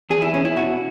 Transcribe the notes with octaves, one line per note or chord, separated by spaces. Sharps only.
E2 G#4
E4
B2 C#4
E4
B2 F#4